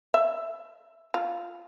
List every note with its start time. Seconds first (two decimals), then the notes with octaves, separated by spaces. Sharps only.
0.14 E5
1.14 F4